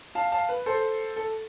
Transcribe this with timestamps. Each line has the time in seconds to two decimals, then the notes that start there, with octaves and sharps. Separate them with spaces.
0.15 F5 A5
0.32 F5 A5
0.49 B4
0.66 A4 C5
1.16 A4